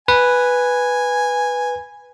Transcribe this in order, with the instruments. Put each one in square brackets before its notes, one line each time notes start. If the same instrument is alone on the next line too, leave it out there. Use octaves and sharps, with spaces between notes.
[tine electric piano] B4 [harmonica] G#5